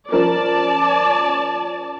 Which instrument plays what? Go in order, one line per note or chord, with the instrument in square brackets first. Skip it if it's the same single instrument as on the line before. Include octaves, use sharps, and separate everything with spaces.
[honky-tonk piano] F3 C#4 A#4 [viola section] D5 A5